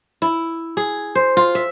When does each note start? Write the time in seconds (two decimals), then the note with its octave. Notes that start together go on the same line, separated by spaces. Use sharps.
0.22 E4
0.77 G#4
1.15 C5
1.37 F4
1.55 E5